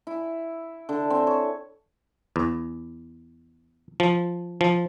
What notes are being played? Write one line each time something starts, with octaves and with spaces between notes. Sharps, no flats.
E4
D3
C4
C#5
E2
F3
F3